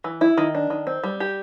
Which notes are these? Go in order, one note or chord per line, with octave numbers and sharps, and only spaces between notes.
E3
E4
D#3
D4
D#3
C4
G3
G4